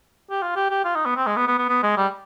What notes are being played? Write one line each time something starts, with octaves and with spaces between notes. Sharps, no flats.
G4
F4
G4
G4
F4
D#4
B3
C4
G#3
B3
B3
B3
B3
G#3
G3